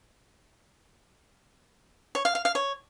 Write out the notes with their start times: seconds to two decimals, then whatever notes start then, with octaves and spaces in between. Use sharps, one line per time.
2.15 C#5
2.25 F5
2.35 F5
2.45 F5
2.55 C#5